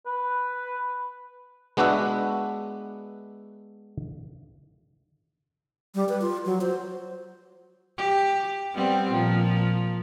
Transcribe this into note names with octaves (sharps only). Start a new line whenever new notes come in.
B4
G#3 B3 D4 F#4 B4 E5
G3
B4
F4
F#3
C5
G4
G3 B3 C4
A#2 F3